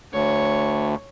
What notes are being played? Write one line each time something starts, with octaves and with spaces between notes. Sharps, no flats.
D2 C#5